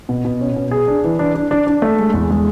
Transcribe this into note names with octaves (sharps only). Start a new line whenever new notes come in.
B2
B2
C#4
B2
G#4
D4
E3
D4
D4
D4
D4
A3
G#3
E2
G#3